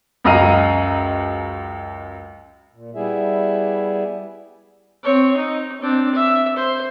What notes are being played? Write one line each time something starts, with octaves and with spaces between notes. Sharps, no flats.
C#2 F#2 D#5 F5 A#5 D#7
A#2
G3 B3 E4 G#4 E5
C4 C#5
D#4
C4 D4
E5
C5